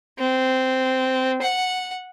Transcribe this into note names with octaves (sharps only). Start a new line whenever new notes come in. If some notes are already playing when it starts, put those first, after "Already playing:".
C4
F#5